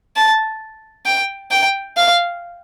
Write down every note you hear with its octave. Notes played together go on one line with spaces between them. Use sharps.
A5
G5
G5
F5